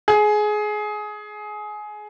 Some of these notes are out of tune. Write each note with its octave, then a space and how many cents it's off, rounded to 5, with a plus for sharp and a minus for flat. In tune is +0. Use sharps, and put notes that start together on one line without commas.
G#4 +20